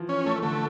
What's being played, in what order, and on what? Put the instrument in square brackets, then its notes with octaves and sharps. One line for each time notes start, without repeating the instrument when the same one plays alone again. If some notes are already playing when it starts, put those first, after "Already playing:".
Already playing: [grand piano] E3 F3
[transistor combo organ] C#4
A3
[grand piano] D3 [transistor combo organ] A3